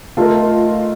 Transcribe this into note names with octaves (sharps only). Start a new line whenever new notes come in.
A3 D#4 F4 A#4